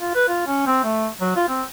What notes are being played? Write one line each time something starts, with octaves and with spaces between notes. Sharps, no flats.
F4
B4
F4
C#4
C4
A3
F#3
F4
C4